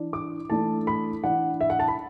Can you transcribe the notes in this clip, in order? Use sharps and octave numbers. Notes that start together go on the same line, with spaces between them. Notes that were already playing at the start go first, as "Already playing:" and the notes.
Already playing: E3 D4
D6
E3 A3 D4 A5
B5
E3 D4 F#5
E5
F#5
A5
B5